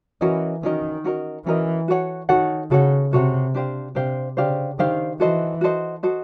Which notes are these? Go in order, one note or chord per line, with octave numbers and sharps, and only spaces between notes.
E3 C#4 F#4 A#4 D#5
D#3 C#4 F#4 A#4 D#5
C#4 F#4 A#4 D#5
E3 C#4 F#4 A#4 D#5
F#4 A4 C#5 F#5
D#3 F#4 A4 C#5 F#5
C#3 F#4 A4 C#5 F#5
C3 F#4 A4 C#5 F#5
D4 G4 C5 F5
C3 D4 G4 C5 F5
C#3 D4 G4 C5 F5
D#3 D4 G4 C5 F5
E3 F#4 A4 C5 D#5
F#4 A4 C5 D#5
F#4 A4 C5 D#5